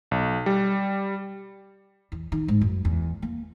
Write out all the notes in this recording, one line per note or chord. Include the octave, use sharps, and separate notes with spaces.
B1
G3
E2
D#3
G#2
F#2
E2
A#3